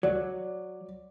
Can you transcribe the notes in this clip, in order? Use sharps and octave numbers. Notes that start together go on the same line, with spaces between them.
F#3 D5